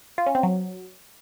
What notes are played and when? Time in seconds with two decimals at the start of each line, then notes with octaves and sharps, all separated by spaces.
0.18 F4
0.26 C#4
0.35 C4
0.43 F#3